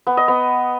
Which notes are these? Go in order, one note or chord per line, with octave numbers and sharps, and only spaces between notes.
B3
D#5
B3